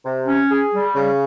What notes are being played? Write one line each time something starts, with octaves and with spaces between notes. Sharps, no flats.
C3
C#4
G#4
G3
C#3